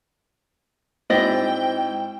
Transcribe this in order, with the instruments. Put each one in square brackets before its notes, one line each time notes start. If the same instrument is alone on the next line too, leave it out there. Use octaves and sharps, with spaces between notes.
[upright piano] G#2 C4 F#4 [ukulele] E4 D5 D#5 [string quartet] G5